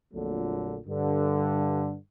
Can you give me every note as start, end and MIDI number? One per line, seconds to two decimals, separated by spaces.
0.14 0.77 34
0.14 0.77 41
0.14 0.77 46
0.14 0.77 50
0.14 0.77 54
0.14 0.77 57
0.87 1.94 43
0.87 1.94 50